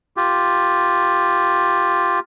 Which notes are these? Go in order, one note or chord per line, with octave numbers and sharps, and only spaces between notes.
F4 G4